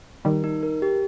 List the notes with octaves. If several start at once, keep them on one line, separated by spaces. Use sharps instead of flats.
D#3 G3 A#4
D#4
A#4
G4